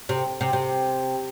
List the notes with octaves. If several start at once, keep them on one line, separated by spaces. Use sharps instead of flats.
C3
C3
C3